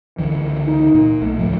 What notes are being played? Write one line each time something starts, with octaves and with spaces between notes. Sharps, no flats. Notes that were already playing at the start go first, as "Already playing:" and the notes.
C#2 D3 E3
D#4
A#2
B1 A3
D2 A2 F3